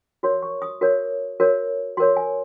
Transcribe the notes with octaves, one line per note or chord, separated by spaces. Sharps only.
F#4 A#4 C#5 C6
C#6
D#6
F#4 A#4 C#5
F#4 A#4 C#5
F#4 A#4 C#5 C6
G#5